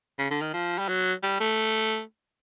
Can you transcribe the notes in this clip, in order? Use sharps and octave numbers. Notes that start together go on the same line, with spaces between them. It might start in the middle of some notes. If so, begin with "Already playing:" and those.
C#3
D3
D#3
F3
G3
F#3
G3
A3